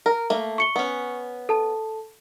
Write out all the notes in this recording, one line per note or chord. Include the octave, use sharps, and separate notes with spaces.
A#4
A3 A#3
C#6 C#7 G7
B3 C#4
A4 A5